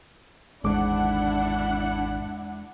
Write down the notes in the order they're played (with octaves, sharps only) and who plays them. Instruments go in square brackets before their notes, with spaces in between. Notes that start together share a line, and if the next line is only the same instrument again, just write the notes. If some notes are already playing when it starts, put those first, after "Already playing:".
[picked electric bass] G#1 D3 [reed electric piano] E2 G#3 D6 [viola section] D4 E4 F#5